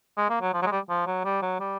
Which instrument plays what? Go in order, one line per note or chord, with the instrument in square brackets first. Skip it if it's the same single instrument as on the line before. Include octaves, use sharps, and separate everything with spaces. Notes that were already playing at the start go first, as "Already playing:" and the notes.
[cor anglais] G#3
A#3
F#3
F3
F#3
G#3
G3
F3
F#3
G3
F#3
G3